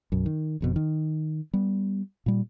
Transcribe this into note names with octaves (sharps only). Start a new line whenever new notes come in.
B1 F#2
D#3
F#1 F2 B2
D#3
G3 B3
A#2 G3